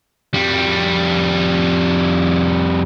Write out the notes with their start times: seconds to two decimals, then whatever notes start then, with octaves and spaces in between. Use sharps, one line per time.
0.34 F2 G3